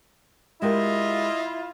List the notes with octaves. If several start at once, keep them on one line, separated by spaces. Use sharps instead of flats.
G#3 E4 F4 G4 A#4 D#5